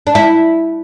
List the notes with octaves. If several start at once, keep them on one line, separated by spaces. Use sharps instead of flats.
D4
E4